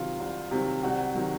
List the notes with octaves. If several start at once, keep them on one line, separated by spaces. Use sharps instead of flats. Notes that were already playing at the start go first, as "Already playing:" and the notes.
Already playing: C3 D#3 F#3 F4
C2
C3 D#3 F#3
C2 F#4
C3 D#3 F#3